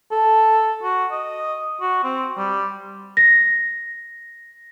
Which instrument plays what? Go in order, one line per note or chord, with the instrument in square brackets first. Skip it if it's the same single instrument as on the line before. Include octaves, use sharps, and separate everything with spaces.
[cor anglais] A4
F#4
D#5
F#4
C4
G3
[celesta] A#6